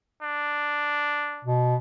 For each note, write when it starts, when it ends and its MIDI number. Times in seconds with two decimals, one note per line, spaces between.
0.23 1.50 62
1.45 1.76 47